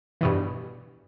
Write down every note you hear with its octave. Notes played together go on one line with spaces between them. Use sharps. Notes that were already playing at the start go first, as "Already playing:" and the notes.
G2 B2 E3